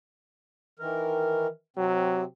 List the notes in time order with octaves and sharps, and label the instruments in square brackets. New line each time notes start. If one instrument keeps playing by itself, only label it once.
[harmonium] D#3 E3 A#4
[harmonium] C3 C4 [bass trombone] F#3